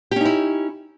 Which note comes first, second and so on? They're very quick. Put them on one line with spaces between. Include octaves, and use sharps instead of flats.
G4 C#4 D#4 E4